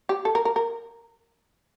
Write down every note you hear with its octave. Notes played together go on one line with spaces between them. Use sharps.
G4
A4
A#4
A#4
A#4